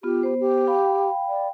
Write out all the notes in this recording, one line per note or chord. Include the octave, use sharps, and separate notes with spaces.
B3 F4 G4
B3 C5
G4
F5 G5 B5
D5